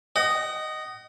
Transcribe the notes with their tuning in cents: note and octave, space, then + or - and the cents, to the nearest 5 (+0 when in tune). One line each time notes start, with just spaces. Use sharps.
D#5 -5 F#5 +40